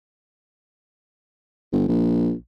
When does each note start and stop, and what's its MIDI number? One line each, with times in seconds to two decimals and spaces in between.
1.72 1.85 31
1.88 2.32 34